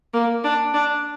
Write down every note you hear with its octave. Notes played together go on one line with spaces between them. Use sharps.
A#3
D4
D4